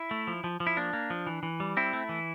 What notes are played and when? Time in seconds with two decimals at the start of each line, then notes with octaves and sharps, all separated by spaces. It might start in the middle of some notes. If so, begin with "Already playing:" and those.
Already playing: E4
0.11 A3
0.27 F3
0.44 F3
0.60 F3
0.67 E4
0.77 A#3 D4
0.93 A#3
1.10 F3
1.27 E3
1.43 E3
1.60 G3
1.77 C4 E4
1.93 A3
2.09 E3